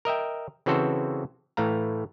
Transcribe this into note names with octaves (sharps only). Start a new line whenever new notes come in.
A#4 D#5 E5 G5
C#3 E3 C4 F#4 A4 C5
A2 E3 A3 F5 A#5